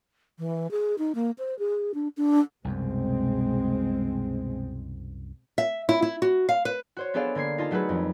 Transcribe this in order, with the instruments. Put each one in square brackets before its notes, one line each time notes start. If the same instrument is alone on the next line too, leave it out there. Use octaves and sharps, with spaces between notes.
[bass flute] E3
G#4
D#4
A#3
C5
G#4
D4
D4
[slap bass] C2 F#2 [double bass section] B2 G#3 C4
[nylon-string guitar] E5
E4
E4
F#4
F5
B4
[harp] F#4 C5 C#5
B3 D4 G#4 A4 D5 F5
D3 A#3 G#6 C7
D#4 F4 A5
F#3 A3 F#4 G#4 B4
F2